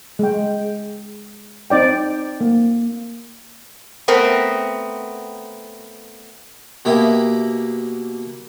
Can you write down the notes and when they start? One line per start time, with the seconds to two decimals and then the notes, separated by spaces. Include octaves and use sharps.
0.19 G#3 G5
1.70 C4 D#4 D5 G5
2.41 A#3
4.08 A3 B3 C4 A#4
6.85 B2 A#3 E4 G4 D#5 E5